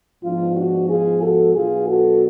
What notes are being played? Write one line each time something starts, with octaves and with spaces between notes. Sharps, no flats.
G#2 F3 B3 D4 F4
D4 F#4
F4 G#4
F#4 A4
B2 F#3 B3 D4 F4 G#4
F#4 A4